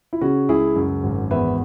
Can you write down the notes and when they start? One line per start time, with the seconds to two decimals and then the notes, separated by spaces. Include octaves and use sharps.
0.13 E4
0.21 C#3 C#4 F#4
0.49 C#2 E4 G#4
0.76 F#2
1.04 G#1
1.31 E2 B4 E5